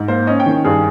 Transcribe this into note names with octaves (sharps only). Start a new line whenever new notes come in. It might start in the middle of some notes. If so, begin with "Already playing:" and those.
Already playing: G#2
A#3 C5
C#4 D#5
G5
D#3
G2 G#4